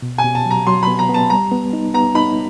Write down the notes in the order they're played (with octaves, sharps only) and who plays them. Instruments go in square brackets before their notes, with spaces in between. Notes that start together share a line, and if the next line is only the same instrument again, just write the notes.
[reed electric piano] B2
[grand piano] G#5
[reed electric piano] B2
[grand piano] A5
[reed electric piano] F#3 [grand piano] A#5
[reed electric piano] F#3 [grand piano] C6
[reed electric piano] B3 [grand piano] B5
[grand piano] A#5
[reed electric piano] B3
[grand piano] A5
[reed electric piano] G3 [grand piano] A#5
[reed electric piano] B3
D#4
[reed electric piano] B3 [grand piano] A#5
[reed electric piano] D#4 [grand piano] B5